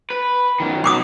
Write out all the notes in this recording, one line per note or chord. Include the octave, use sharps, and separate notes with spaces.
B4
F#2 D#3
B1 F#3 C6 D6 D#6